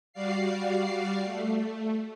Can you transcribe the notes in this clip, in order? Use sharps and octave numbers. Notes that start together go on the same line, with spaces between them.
G3 F#4 D5 F5 C7
A3